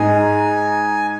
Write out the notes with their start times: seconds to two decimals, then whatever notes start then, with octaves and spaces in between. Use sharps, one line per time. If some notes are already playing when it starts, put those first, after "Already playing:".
Already playing: G#2 G#3 D#4 G#4 D#5 G#5